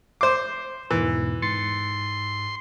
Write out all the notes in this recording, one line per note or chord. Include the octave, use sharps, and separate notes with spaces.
C5 D6 C7
E2 G#2 B2 E3
G#2 C6 A6 C#7